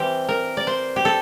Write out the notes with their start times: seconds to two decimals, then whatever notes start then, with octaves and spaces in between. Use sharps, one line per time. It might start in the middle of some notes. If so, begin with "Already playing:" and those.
Already playing: E3 G3 C4 G4
0.29 A#4
0.57 D5
0.67 C5
0.96 G4
1.05 A4